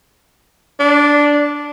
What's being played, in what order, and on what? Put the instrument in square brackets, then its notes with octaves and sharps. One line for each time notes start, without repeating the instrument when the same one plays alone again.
[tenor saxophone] D4